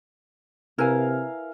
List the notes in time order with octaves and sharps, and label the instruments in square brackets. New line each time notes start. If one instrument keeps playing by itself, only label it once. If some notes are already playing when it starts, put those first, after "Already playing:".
[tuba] C3 [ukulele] E4 B4 G#5 [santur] A#4 F5